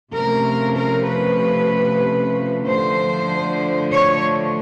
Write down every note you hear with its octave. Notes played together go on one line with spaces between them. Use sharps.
C3 F3 A3 C#4 A#4
A#4
B4
D3 F3 A3 C5
C#5